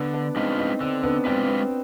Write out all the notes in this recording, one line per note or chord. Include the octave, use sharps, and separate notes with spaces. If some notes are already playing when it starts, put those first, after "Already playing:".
Already playing: D3 B3
B3 D4
G#3 C4 D4 D#4 F4 B4
C4 D#4
D3 C4
B3 D4
G#3 C4 D4 F4 B4
B3